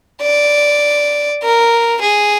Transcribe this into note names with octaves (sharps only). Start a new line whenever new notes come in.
D5
A#4
G#4